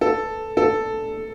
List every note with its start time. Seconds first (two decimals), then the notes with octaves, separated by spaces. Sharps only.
0.01 A4
0.57 A4